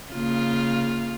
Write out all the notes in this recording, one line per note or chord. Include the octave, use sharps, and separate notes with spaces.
C#3 A#3 F4